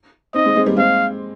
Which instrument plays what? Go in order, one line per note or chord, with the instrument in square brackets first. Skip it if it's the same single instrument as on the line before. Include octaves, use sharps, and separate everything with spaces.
[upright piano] C4 D#4 [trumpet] D#5
[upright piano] G#3 C4
G#3 C4
G3 A#3
[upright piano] G#3 C4 [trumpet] F5